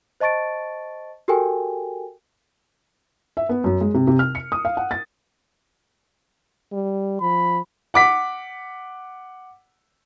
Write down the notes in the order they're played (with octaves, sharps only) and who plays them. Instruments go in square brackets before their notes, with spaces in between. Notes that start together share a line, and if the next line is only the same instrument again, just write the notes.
[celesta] C5 D#5 A5 C#6 A6 D7
F#4 G4 A4 A#4 G5 G#5
[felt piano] E5
B3
F#2
G#3
C3
C3
F6
C#7
D#6
F5
F#5
A6
[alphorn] G3
[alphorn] F3 [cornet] B5
[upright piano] F#5 D6 B6